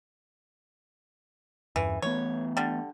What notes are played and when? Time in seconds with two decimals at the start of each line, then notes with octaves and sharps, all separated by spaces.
1.76 E2 G2 E3
2.02 E3 A3 B3 C#5
2.57 D3 G3